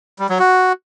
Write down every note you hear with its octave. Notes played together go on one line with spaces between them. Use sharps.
G3
F#3
F#4